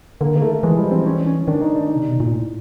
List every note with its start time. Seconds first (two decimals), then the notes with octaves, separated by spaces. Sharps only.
0.21 D3 A#3
0.35 D#3 A#3
0.42 A3
0.63 E3 G#3
0.77 F3 G3
0.91 E3 C4
1.06 C#4
1.26 C#4
1.47 D#3 D4
1.61 D#4
1.76 D4
1.90 D#4
1.96 C3
2.08 B2
2.20 A#2
2.32 A2